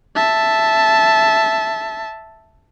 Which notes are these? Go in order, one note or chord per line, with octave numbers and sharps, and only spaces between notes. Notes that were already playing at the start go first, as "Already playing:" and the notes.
E5 A5